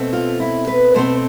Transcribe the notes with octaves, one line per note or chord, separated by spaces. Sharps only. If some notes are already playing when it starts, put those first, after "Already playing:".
Already playing: B2 A3 C4
F4
E4
B4
B2 A3 C4 C5